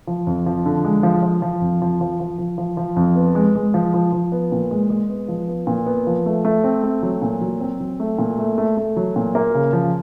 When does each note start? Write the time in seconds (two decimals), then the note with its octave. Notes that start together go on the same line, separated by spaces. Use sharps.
0.07 F3
0.27 F2
0.46 F3
0.66 D3
0.84 G#3
1.03 F3
1.23 F3
1.42 F3
1.61 F2
1.82 F3
2.01 F3
2.20 F3
2.38 F3
2.58 F3
2.77 F3
2.96 F2
3.16 B3
3.35 G#3
3.55 G#3
3.74 F3
3.94 F3
4.13 F3
4.32 B3
4.52 A#2
4.71 G#3
4.90 G#3
5.09 B3
5.28 F3
5.48 B3
5.67 A#2
5.86 B3
6.07 F3
6.26 A3
6.45 A3
6.64 C4
6.83 A3
7.03 F#3
7.22 A#2
7.41 F#3
7.60 C4
7.80 F#3
8.00 A3
8.19 A#2
8.39 A3
8.58 A3
8.77 A3
8.97 F#3
9.16 A#2
9.35 A#3
9.54 C#3
9.73 F3